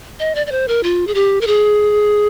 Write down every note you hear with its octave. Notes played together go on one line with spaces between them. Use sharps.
D#5
D5
D5
C5
A#4
F4
G#4
G4
A#4
G#4